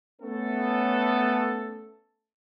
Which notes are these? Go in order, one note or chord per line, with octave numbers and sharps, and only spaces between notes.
A3 B3 C#4 A4